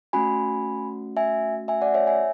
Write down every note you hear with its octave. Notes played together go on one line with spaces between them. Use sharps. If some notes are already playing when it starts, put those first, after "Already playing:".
A3 C#4 F#4 G#5 B5
E5 G#5
E5 G#5
D5 F#5
C#5 E5
E5 G#5